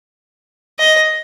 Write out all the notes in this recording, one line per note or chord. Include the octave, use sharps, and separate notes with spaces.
D#5